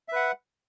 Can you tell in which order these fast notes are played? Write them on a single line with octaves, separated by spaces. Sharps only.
E5 B4 F#5